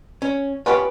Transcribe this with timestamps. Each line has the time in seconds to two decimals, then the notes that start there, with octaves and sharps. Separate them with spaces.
0.22 C#4
0.66 B3 C#4 F4 G4 B4